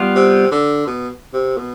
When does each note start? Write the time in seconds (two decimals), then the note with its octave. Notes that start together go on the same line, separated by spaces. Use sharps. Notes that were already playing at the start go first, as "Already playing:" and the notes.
Already playing: G3 B3 F4
0.15 C3
0.51 D3
0.87 B2
1.33 C3
1.57 B2